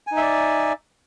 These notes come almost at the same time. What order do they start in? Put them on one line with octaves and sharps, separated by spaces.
G#5 D#4 E5 D5